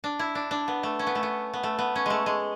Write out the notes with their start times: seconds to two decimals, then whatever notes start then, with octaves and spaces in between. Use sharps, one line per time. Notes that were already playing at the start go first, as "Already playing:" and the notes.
0.04 D4
0.19 E4
0.35 D4
0.51 D4
0.68 B3
0.83 A3
0.99 C#4
1.07 B3
1.15 A3
1.23 B3
1.53 B3
1.63 A3
1.79 B3
1.96 C#4
2.06 G#3 A3
2.26 G#3